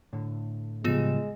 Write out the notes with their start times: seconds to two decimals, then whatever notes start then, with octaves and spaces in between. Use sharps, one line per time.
0.13 A2 D3
0.84 A2 C#3 F3 G3 G#3 B3 F4 E7